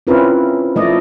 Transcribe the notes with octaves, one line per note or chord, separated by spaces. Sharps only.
C4 C#4 E4 F4 A#4 B4
F3 A3 A#3 E4 D5 D#5